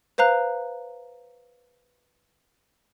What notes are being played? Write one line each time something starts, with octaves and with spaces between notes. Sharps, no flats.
B4 C5 F5 A#5 F#6